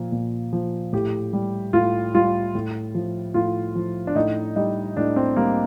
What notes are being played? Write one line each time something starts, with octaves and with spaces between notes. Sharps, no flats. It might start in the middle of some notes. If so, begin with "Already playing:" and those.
Already playing: A#2 F3
A#2
F3
A2 G4
G3
A2 F4
G3 F4
A2
F3
A2 F4
F3
D4
A2 D#4
G3 D#4
A2 D4
C4
G3 A#3